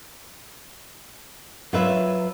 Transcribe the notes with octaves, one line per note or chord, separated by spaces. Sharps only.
F#3 F4 B4 E5